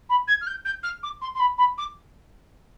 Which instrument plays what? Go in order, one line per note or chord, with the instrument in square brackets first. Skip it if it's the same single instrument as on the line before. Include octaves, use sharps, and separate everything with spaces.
[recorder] B5
G#6
F6
G6
G6
F6
D6
C6
C6
B5
B5
D6